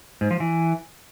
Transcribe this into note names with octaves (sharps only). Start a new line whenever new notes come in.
G#2
F3
E3